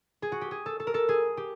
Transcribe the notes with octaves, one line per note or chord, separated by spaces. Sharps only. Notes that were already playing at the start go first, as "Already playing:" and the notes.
G#4
F#4
G4
G#4
A4
A4
A#4
A4
G#4
G4